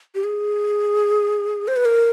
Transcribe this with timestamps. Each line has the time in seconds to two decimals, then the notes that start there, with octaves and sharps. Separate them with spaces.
0.15 G4
0.24 G#4
1.68 C5
1.76 B4
1.85 A#4